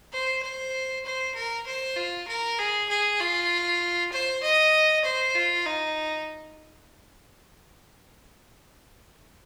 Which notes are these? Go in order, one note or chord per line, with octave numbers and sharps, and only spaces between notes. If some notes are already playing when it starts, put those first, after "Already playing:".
C5
C5
C5
A#4
C5
F4
A#4
G#4
G#4
F4
C5
D#5
C5
F4
D#4